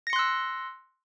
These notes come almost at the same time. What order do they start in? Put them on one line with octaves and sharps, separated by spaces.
A#6 C#7 C6 F#6 E6